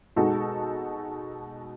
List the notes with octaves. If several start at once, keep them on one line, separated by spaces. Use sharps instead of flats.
B2 G#3 D#4 F#4 A4